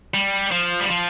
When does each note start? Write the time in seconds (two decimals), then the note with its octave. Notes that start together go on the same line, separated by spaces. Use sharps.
0.14 G3
0.51 F3
0.80 G3
0.88 F3